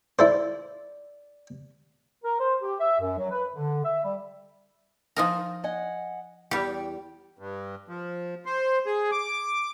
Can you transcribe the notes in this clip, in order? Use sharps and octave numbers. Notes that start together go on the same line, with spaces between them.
E4 A4 C5 D5
A#4
C5
G4
E5
F#2
F#3
B4
D3
E5
G3
F3 D#4 A#4
D#5 F#5 G#5
E2 G3 G4 G5
G2
F3
C5
G#4
D6